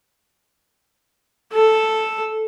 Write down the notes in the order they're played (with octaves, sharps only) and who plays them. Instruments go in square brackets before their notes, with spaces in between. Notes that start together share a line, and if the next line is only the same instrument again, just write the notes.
[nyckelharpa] A4